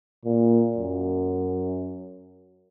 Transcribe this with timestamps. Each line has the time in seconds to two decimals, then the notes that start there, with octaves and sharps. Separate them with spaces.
0.25 A#2
0.77 F#2